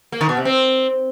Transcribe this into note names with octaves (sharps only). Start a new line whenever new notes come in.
A#3
D#3
B2
C3
C4